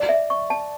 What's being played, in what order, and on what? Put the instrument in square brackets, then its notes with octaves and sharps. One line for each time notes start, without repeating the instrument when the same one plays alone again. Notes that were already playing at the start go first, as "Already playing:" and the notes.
Already playing: [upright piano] D5
[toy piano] E5
C#6
A5